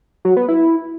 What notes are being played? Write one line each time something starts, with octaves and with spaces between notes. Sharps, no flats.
F#3
B3
E4